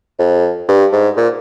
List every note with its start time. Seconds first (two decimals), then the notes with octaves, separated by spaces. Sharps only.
0.19 F2
0.68 G2
0.92 G#2
1.17 A#2